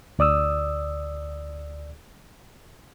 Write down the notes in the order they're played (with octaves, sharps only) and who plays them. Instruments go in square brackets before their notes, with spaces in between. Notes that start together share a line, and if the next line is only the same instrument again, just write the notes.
[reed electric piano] D2 D5 D#6 E6